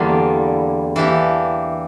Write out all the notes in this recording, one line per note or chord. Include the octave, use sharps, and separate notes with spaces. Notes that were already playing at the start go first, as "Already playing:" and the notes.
Already playing: E2 D3 G3 A#3 F4
E3 A#3 D4 G4